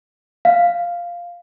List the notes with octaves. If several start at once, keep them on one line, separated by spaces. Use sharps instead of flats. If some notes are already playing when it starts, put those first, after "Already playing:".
F5